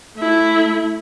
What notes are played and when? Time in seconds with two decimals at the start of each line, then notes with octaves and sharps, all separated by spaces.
0.16 A3 E4